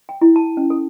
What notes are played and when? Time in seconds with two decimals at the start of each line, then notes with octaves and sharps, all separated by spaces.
0.09 G5
0.21 E4
0.36 A5
0.57 C#4
0.70 A4